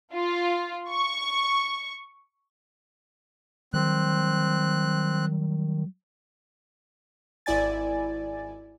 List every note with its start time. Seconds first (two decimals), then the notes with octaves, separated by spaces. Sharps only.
0.12 F4
0.89 C#6
3.74 D#3 F#3 G3 C4 F#6
7.46 G#1 E4 D5 G#5 A6